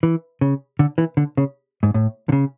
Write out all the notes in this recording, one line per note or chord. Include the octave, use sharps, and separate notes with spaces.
E3
C#3
D3
E3
D3
C#3
G#2
A2
D3
C#3